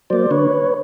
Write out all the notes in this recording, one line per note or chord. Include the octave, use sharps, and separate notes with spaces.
F#3 A#3 C5 D5
D3 B4 C#5